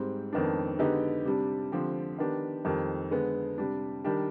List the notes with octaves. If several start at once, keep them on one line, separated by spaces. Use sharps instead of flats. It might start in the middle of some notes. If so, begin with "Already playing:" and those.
Already playing: G#2 G3 C4
F2 D#3 B3 D4
D3 G#3 B3 D#4 G4
C3 G3 D4
D3 F3 C4 G4
D#3 B3 D4 G4
F2 D#3 G3
D3 G#3 B3
C3 G3 D4
D#3 G3 D4 G4